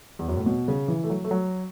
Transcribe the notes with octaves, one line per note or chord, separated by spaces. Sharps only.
E2
F#2
A2
B2
C#3
E3
A3
F#3
A3
F#3